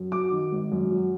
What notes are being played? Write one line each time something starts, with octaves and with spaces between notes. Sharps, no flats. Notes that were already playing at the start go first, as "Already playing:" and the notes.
Already playing: F#2
F#3 D6
D#3
G#1
F#2
F#3